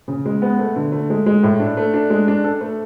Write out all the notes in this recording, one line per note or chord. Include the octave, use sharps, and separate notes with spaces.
C#3
G#3
B3
A3
D3
A3
G#3
G#3
A2
D4
A3
D4
G#3
D4
A4
A3